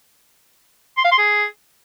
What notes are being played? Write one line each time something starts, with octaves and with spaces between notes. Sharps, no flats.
C6
F5
C6
G#4